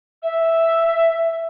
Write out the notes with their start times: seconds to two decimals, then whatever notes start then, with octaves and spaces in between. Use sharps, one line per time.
0.22 E5